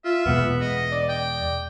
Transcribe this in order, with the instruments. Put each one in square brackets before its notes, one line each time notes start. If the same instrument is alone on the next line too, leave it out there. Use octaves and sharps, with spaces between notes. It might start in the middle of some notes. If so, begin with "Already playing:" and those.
[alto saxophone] F4 [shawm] E5
[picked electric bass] E2 B2 G#3 [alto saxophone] B3
[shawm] D#5
[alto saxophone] D5
[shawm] G5